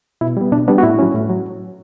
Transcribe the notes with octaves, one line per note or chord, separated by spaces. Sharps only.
B2 E4
G3 B3
B2 D4
G3 B3 D4
F#4
A2 E4
F#3 C#4
A2
F#3